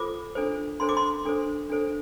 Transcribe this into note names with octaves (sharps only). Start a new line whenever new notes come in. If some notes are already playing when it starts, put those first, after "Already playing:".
Already playing: F4 A4 C5 D6
D4 A4 C5
D4 A4 C5 C6
D6
C6
D4 A4 C5
D4 A4 C5